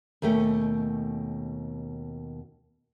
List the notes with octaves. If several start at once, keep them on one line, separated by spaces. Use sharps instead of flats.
D#2 B2 A3 C#4